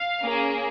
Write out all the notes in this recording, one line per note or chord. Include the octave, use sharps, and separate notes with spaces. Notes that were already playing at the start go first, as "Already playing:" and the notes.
Already playing: F5
A#3 C#4 G#4